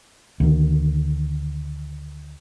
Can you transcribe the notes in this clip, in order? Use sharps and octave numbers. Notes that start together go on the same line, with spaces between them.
D2 D#3